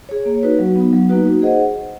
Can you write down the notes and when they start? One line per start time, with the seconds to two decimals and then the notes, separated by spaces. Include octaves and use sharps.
0.09 G#4 C#5
0.25 A#3
0.43 D#4 F#4 B4
0.59 F#3
0.76 B3 D#4
0.93 F#3
1.09 A#3 D#4 F#4 B4
1.25 D#4
1.42 G#4 C5 D#5 F#5